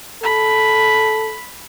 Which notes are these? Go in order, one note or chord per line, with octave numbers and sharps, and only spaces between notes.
A4 B5